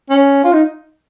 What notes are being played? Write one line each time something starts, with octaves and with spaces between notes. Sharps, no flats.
C#4
F4
D#4